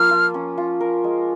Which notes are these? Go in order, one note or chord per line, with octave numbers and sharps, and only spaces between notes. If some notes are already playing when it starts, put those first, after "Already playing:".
Already playing: F3 A#3 F6
F4
C#4
F4
A#4
G#3